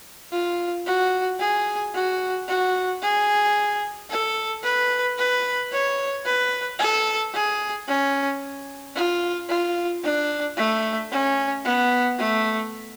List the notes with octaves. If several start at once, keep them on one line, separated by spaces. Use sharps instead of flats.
F4
F#4
G#4
F#4
F#4
G#4
A4
B4
B4
C#5
B4
A4
G#4
C#4
F4
F4
D4
A3
C#4
B3
A3